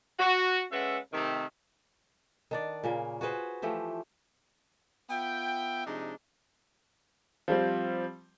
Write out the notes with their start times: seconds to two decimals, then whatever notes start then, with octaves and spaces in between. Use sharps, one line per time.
0.19 F#4
0.72 G#3 C#4 A4 B4 E5 F#5
1.13 C3 D#3 A3
2.51 D#3 D4 D5
2.84 A#2 C#3 A#3
3.21 F#4 G#4 B4 C5
3.62 E3 F3 A3 G4
5.10 B3 F4 E5 G5
5.85 C3 F3 G#3 D4 D#4
7.48 F3 G3 C4